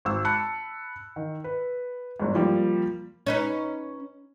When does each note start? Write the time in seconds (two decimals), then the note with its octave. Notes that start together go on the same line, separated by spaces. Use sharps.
0.05 G#1 E6
0.25 A5 B5 F#6 C#7
1.16 D#3
1.44 B4
2.20 G1 G#2
2.35 F3 G3 A#3
3.26 C#4 D#4 B4